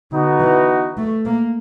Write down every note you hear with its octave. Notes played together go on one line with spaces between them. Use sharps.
D3 B3 D#4 F#4
E3
A3
A#3